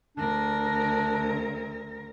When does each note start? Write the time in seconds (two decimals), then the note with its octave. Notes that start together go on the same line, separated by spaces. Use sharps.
0.18 D2 D4 A#4